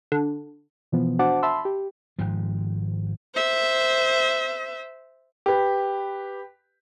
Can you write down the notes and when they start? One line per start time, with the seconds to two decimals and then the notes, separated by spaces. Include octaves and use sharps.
0.12 D3
0.92 B2 E3 F3 B3
1.19 D4 F#4 C5 F#5 A5 D6
1.43 E5 A5 B5 C6 E6
1.65 G4
2.19 G#1 G#2 F3
3.34 C5 E5
5.46 G4 B4